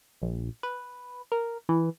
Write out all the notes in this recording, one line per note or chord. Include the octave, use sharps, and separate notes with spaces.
A#1
B4
A#4
E3